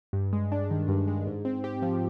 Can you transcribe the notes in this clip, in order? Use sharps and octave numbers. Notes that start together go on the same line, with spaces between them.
G2
G#3
D4
D#3
G2
G#3
G#2
C4
G4
F3